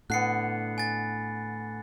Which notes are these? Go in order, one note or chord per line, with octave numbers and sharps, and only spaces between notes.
A2 D3 B3 F#6 C7 C#7
G#5 A6